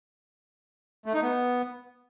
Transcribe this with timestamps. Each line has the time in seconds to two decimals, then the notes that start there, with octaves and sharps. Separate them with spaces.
1.06 A3
1.14 D#4
1.22 B3